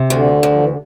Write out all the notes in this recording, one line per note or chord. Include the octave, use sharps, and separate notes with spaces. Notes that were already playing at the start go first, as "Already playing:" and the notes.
Already playing: C3
D2 D3
D2
F3
E3
D3